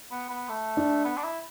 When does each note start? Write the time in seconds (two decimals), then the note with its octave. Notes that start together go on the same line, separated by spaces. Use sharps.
0.11 B3
0.30 B3
0.49 A3
0.77 D4
1.05 B3
1.17 D4
1.24 E4